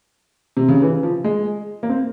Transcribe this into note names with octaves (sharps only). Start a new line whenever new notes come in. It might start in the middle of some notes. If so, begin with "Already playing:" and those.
C3
C#3
E3
F3
G#3
A#3
C4